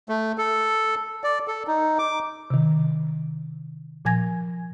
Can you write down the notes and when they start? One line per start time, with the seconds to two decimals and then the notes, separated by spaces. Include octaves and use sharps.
0.09 A3
0.38 A4
1.24 D5
1.48 A4
1.67 D#4
1.99 D6
2.50 C3 D#3
4.05 A#2 F3 G#5 G#6 A#6